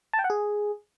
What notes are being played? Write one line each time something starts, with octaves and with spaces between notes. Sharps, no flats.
A5
G5
F#5
G#4